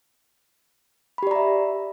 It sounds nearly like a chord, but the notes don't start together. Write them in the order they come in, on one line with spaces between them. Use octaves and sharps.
B5 G4 D5 A#5 E5